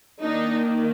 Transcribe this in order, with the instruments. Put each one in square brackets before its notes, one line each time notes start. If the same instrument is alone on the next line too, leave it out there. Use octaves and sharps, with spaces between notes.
[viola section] D#3 A#3 D4 D#4